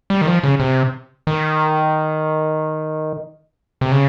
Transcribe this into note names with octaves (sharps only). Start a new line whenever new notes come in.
G3
D#3
F3
C#3
C3
D#3
C3
C#3